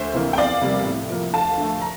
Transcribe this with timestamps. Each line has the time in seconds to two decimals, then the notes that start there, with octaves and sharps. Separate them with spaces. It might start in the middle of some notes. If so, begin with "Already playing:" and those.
Already playing: D2 C5 E5
0.14 C3 E3 A#3
0.33 G5
0.38 E2 D5 F5
0.61 C3 G3 A#3
0.85 A2
1.09 F3 A#3
1.33 D2 F5 A5
1.58 D3 A3
1.81 A#5